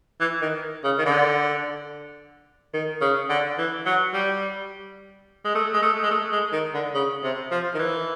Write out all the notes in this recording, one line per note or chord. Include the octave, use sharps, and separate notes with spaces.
E3
D#3
C#3
D#3
D3
D#3
C#3
D3
E3
F#3
G3
G#3
A3
G#3
A3
G#3
A3
G#3
D#3
D3
C#3
C3
F3
D#3
E3